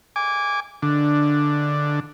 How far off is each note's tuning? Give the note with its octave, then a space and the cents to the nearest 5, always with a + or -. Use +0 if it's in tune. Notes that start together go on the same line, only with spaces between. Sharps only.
G#5 -20 D6 -15
D3 +5 D4 +0